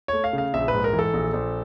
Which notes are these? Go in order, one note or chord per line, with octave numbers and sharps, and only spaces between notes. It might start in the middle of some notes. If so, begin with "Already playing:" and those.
A3 C#5
F5
C#3
F5
A#1 E5
B4
G#2
A#4
E3
A4
A#1
A#1